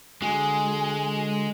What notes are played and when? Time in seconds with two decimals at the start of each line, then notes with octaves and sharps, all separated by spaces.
0.22 D3 G#3 F#4 G#5